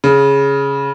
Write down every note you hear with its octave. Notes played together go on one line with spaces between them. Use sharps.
C#3